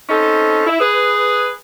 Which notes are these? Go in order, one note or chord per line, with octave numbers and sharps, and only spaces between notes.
C4 C#4 D#4 A4
E4
G#4 B4